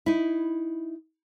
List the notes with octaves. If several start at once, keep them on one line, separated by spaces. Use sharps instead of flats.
D#4 E4